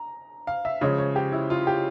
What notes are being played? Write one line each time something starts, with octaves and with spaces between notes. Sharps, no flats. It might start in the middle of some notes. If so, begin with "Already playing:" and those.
Already playing: A#5
F5
E5
C#3 F3 G#3 C#5
C#5
G4
E4
F4
G4